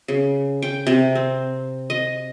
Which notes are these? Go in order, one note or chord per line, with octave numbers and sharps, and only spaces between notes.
C#3
G5
C3
C4
D#5